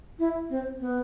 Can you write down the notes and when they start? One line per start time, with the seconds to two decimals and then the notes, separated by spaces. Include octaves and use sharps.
0.19 E4
0.50 C4
0.80 B3